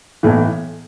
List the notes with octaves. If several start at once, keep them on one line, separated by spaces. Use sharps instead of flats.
B1 A2 E3